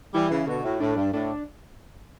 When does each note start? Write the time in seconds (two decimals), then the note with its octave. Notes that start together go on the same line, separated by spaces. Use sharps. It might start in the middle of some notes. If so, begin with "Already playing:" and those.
0.14 E3 G3 E4
0.30 C#3 E3
0.46 B2 D3 F#4
0.64 A2
0.80 A2 D4
0.97 G2
1.13 A2 D4